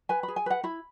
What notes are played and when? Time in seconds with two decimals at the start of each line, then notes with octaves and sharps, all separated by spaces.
0.09 B4 G#5
0.23 B5
0.28 G#4
0.36 G#5
0.46 B4 F#5
0.64 E4 B5